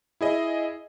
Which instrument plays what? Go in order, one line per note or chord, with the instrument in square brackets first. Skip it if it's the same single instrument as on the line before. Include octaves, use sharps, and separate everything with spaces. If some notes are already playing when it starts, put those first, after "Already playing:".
[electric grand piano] E4 G#4 D#5